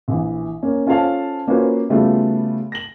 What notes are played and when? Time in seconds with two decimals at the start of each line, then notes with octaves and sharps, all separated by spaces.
0.08 A#1 E3
0.63 A#3 C#4
0.87 C#4 F4 A4 C5 F5 A5
1.48 A#3 C#4 F4 F#4 B4 C5
1.89 C#3 G3 A3 B3 F4 F#4
2.72 A#6 F#7